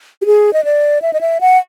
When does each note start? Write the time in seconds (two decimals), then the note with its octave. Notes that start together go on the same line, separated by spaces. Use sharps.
0.22 G4
0.26 G#4
0.53 D#5
0.65 D5
1.02 E5
1.13 D#5
1.21 E5
1.41 F#5